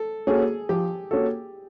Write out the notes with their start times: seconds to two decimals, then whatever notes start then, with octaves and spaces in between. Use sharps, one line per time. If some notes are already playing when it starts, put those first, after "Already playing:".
Already playing: A4
0.27 A#3 C#4 F#4 G#4 A4
0.69 F3 G4
1.11 A#3 C#4 F#4 A4